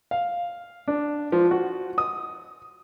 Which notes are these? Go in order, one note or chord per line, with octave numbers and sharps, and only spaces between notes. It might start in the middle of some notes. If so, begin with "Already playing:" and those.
F5
D4
F3
F#4
D#6